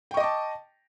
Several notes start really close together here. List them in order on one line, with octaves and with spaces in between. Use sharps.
G5 C#6 D#5 D6 A5